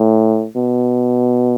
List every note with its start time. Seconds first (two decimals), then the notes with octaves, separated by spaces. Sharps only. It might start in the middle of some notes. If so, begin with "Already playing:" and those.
Already playing: A2
0.56 B2